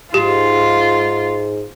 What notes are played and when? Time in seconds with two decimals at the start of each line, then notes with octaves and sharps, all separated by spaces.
0.14 G#2 F4 G4